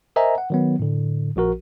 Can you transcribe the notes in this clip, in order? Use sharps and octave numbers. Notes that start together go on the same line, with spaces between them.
A#4 C5 D#5 E5 G#5 A#5
F#5
D#3 F#3 B3
A2 D3
A#1 F3 F#4 A#4